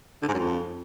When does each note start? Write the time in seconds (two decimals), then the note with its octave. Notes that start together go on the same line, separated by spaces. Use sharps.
0.23 D3
0.28 G#2
0.34 F#2
0.39 F2